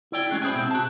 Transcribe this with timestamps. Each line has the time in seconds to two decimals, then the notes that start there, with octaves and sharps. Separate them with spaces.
0.12 E4 D5 G5
0.30 G#3 C#4 F#4 G#4
0.42 E4 G#4 C5 G5 G#5
0.55 B2 C4
0.71 F#4 A5